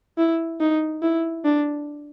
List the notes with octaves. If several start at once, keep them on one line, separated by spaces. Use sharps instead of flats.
E4
D#4
E4
D4